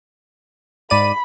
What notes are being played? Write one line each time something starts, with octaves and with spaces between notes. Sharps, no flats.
G#2 D5 B5 D#7